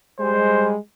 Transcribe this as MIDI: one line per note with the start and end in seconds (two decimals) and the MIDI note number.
0.20 0.76 55
0.20 0.76 56
0.20 0.71 72